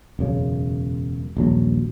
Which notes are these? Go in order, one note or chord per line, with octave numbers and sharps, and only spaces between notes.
E1 F#2 C#3
D#1 A#1 F#3